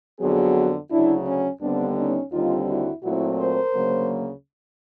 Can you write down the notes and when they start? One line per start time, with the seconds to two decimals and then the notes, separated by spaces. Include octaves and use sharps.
0.20 F2 D3 F#3 B3 F#4 G#4
0.91 D2 C#3 F#3 D4 E4
1.26 C#4
1.62 D#2 D3 G3 B3 C4 D4
1.97 C#4 D#4
2.32 D#2 D3 G3 C4 D#4 F4
2.68 E4 F#4
3.03 A#2 F#3 A3 C4 E4 F#4
3.38 A#4 C5
3.74 D2 C#3 F#3 A#3